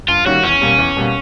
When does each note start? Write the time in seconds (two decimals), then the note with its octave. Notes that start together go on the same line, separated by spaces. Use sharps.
0.08 G2 F4
0.26 D#3 G3 A#3 C#4 F#4
0.44 E2 C#4
0.61 B2 G3 A#3
0.79 E2
0.97 B2 G3 A#3